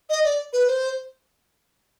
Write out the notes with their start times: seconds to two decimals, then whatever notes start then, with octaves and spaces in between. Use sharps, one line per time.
0.10 D#5
0.24 D5
0.53 B4
0.68 C5